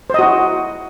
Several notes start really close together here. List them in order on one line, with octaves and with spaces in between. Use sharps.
C5 D#5 F#4 E4